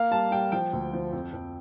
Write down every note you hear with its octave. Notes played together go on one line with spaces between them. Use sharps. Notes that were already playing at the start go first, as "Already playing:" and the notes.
Already playing: A#3 F5
G3 A5
G3 G5
F3 G5
D2
F3
F2
F2